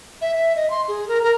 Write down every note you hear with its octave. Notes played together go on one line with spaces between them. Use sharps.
E5
E5
D#5
C6
G#4
A#4
A#4